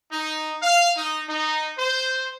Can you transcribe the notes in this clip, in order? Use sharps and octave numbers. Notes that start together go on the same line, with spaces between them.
D#4
F5
D#4
D#4
C5